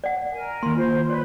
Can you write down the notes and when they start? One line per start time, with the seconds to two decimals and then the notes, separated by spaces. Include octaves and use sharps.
0.04 D5 F#5
0.31 A#4 G#5
0.63 D#3 A#3 C6
0.77 F4 C5
1.10 B4 C#5 D5